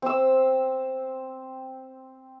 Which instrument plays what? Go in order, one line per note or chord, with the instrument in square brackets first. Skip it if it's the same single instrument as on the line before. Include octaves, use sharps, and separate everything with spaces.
[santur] C4 E6